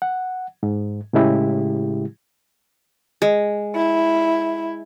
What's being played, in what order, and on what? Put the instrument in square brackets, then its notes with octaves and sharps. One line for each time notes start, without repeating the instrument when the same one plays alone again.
[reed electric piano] F#5
G#2
A2 C#3 G#3 E4 G4
[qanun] G#3
[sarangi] E4